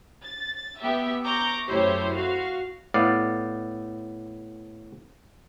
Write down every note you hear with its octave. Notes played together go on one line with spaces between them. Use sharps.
A6
B3 G4 E5
A#5 C#6 D6 G6 A#6
F#2 A3 E4 G4 C5 C#5
F#4 F5
A2 B3 D5 F5